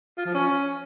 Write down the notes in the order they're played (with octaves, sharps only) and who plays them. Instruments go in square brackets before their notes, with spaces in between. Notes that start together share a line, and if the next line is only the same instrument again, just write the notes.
[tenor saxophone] F4
F3
C#4